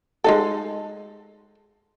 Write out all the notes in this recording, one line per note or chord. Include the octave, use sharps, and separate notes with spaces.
G#3 D#4 A4